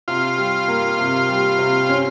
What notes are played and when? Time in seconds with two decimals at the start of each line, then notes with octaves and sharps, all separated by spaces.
0.08 C3 F4
0.38 G3
0.68 A#3
0.99 C3
1.29 G3
1.58 C3
1.89 C#4